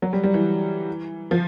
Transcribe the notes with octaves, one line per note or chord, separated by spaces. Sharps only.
F#3
G3
G3
E3
F3